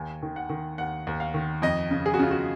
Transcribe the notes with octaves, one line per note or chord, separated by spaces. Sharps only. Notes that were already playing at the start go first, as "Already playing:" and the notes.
Already playing: D#2 G#5
D#3
F#5
D#3
D#2 F#5
D#2
F5
D#3
F2 D#5
C#3
G#4
F#4
C#3 F4
F#4